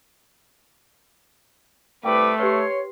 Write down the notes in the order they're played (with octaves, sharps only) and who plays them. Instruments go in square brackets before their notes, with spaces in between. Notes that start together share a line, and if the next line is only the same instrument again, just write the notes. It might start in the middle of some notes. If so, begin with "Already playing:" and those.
[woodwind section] C2 D6 [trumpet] A3 [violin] B4 [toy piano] G5
[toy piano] G4 B4 [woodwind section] C#5 [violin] C6